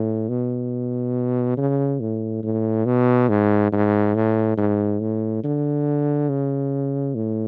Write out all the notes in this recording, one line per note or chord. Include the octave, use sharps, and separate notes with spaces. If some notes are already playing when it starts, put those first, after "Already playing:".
Already playing: A2
B2
C#3
A2
A2
B2
G#2
G#2
A2
G#2
A2
D3
C#3
A2